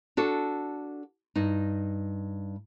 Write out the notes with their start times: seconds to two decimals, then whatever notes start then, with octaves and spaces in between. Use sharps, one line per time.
0.17 D4 F#4 A4
1.36 G2 D#4